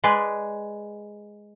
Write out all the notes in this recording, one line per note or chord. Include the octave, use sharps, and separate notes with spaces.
G#3 G#4 B4 D5